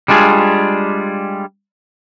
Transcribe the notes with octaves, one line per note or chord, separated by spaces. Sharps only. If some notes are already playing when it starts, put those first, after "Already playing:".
G3 G#3 D4 F4 G#4